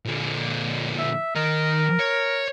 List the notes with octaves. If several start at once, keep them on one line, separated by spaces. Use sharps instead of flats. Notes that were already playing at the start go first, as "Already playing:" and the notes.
A#2 D3
E5
D#3 A#4 D#5
C#5